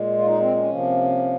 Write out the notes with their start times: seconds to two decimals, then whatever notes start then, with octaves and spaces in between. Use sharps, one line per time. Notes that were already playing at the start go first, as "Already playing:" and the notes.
Already playing: A#2 G#3
0.18 F4
0.26 D#4
0.40 C4
0.55 C#4
0.69 C3 F3 A#3